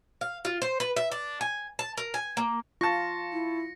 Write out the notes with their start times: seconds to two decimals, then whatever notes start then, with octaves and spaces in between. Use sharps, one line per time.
0.21 F5
0.45 F4
0.62 C5
0.80 B4
0.96 E5
1.12 D4
1.41 G#5
1.79 A5
1.97 A#4
2.14 G#5
2.37 A#3
2.81 F4 A5 C#6 A#6 C#7
3.32 E4